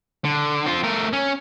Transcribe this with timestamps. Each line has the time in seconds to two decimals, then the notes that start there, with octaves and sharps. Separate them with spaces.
0.25 D3
0.66 C4 F4
0.84 A3 A#4
1.13 C#4